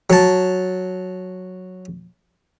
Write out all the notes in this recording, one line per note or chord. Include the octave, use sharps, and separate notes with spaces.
F#3 A5